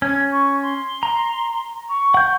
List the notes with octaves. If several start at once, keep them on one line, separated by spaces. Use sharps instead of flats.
C#4 G#6
C#6
C6
A#5
C#6
F#5 G6